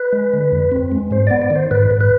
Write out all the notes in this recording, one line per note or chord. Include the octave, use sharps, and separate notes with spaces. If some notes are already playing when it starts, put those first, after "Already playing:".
Already playing: B4
G#3
D3
F2
C4
G#3
G#2 C5
B3 D5
D5
D#3
C5
G#2 B4
G#2
B4